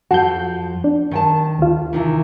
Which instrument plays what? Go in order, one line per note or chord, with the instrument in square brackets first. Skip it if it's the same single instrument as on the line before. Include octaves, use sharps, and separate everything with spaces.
[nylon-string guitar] F2 F3 A5 [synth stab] F#4 G6
[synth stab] D4
[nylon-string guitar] D#3 G5 A5
[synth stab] D#2 F4
[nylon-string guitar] C3 D#3 E3